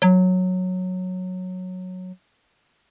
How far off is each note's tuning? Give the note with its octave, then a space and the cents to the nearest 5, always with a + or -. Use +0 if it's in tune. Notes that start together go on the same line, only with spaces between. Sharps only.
F#3 -10